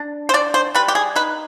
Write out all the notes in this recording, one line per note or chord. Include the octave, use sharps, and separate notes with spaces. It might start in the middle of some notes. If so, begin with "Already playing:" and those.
Already playing: D4
C5
D4 D5
C5
G3 B4
G4
G#4
D#4 B4